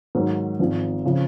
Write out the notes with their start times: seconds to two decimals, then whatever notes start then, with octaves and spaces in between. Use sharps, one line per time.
0.15 G#2 D#3 F#3
0.59 G#1 G#2 F3
1.05 C#3 F3